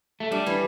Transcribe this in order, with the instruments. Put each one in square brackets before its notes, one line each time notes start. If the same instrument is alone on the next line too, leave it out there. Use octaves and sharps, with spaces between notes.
[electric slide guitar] A3
[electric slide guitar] G3 [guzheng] D4
[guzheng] E3